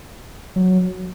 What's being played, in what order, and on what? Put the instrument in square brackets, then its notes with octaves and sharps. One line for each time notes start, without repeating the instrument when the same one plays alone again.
[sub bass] F#3